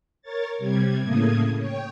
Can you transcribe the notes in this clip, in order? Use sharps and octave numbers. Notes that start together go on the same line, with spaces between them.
A#4 C#5 A6
C3 G3 G#6
A2 C#3 A3 A#3 D#6 G#6
C#5 G5